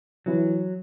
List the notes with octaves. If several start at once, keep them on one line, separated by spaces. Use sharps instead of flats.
E3 F#3